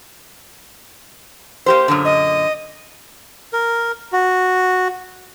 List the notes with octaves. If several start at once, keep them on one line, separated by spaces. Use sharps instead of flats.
A#3 G4 C5
F#2 A#2 D3
D#5
A#4
F#4